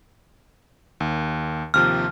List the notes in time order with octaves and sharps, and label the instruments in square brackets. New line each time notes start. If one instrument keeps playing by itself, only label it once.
[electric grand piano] D#2
[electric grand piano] D#2 C3 F3 [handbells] F6